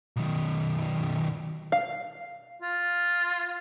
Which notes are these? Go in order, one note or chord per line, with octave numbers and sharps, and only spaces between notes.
B1 D#3
F5
F4